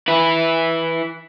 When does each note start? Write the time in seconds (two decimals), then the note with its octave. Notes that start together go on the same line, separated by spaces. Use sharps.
0.08 E4 B4